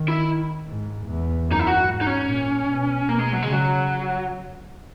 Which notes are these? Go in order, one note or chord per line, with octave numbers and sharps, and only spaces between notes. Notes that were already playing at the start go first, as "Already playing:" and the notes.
Already playing: D#3
E4
G#2
E2
F#2 D#4
E4
F#4
G#2
D#4
C#4
A#2
B2
B2 A#3
G#3
F#3
C#3 G#3
F#3